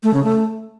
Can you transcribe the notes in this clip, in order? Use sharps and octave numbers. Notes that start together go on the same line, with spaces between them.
A3
C#3
A3